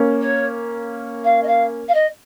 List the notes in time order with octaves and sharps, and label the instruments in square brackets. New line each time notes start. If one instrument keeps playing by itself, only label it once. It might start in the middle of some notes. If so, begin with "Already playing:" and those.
Already playing: [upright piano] A#3 C#4
[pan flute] C#5
F5
D#5
F5
F5
D#5